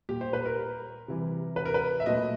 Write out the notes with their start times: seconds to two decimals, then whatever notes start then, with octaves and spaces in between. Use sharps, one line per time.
0.09 A#2 G3 G4
0.21 C5
0.33 B4
0.46 A#4
1.08 C3 E3 G3
1.56 B4
1.65 A#4
1.74 B4
2.00 E5
2.06 A#2 F#3 A3 D#5